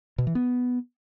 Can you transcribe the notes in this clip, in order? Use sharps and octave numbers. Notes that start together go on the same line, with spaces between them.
B2
E3
B3